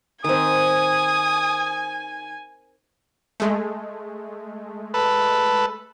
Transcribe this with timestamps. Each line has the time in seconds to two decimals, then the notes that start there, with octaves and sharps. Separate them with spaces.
0.24 D#3 C4 G#5 D#6
3.40 G#3 A3
4.94 A4 B4